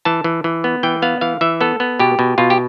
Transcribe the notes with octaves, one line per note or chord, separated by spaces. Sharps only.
E3 A5
E3
E3
B3
E3 G5
B3 F5
E3 F5
E3 E5
B3 A4
B3
B2 G4
B2
B2 F4
G4